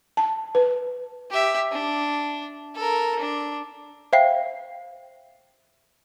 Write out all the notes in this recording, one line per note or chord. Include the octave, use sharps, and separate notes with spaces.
A5
B4
G4 E5
D4
A4 A#4
D4
C5 E5 F5 G5 C7